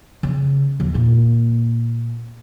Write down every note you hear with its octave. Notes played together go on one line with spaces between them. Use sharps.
C#3
D#2
A#2 A#3